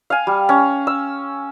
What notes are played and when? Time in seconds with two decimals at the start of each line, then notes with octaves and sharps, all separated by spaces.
0.10 F5 G#5
0.27 G3
0.49 C#4
0.87 E6